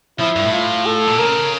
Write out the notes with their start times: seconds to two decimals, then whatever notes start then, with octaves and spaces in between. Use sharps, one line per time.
0.19 F3 E4
0.36 G2
0.45 A2
0.53 F4
0.86 A4
1.07 A#2
1.19 C#3 A#4